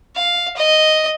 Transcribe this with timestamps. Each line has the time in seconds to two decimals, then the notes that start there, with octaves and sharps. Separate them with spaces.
0.16 F5
0.56 D#5